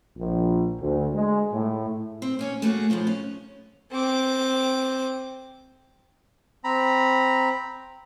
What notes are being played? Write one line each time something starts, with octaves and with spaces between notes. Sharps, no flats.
A#1
D2
G#3
A2
C4
A#3 C#4 C#5
A3 A#3 D4 F#4 G#4
F#2 A2 F3 F4
C#4
C4 D6
C4 A#5 B5